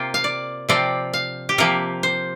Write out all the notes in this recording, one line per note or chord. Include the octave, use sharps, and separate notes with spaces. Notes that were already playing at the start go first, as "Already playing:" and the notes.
Already playing: C3 A#3 F4 G5
F5
D5
C3 F3 C4 D5
F5
G4
C3 F3 A#3 A#4
C5